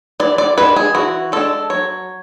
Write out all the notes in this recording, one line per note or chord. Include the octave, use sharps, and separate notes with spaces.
E3 D5
D5
G#3 D4 B4
G#4
E3 F#4
G#3 D4 A4
F#3 C#5